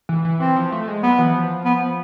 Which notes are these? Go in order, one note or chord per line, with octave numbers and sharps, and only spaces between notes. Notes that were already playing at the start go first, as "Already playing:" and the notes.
E3
E3
E3 C4
F3
A3
G#3
F#3 B3
E3
F3
B3